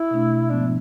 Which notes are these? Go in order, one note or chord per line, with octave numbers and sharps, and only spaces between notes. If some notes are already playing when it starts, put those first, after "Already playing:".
Already playing: E4
B2 A3 D4
G#2 F3 G#3 B3 D4